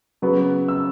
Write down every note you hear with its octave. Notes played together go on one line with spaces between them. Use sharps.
C#3 F#3 B3
E6